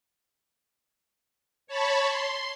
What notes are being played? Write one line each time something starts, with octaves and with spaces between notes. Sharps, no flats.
C#5 A5 B5 C#6
C6